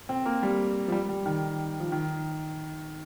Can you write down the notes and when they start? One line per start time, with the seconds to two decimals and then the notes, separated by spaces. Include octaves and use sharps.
0.09 C4
0.26 A#3
0.43 G3
0.88 F3
0.92 G3
1.09 G3
1.26 D#3
1.80 F3
1.92 D#3